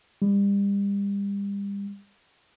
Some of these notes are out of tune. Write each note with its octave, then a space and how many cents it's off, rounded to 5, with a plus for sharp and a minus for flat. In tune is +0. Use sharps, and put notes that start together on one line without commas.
G3 +35